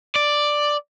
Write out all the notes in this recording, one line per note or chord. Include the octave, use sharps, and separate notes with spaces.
D5